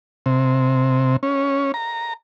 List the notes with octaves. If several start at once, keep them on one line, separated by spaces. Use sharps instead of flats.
C3
C#4
A#5